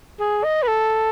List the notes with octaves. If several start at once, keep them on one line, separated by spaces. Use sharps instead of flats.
G#4
D#5
B4
A4